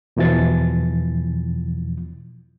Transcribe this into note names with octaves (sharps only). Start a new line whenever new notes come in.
E2 B2 E3 F3 A6